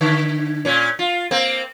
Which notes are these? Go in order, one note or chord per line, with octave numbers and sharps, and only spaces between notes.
D3
A#2 C#4
F4
A#3 C4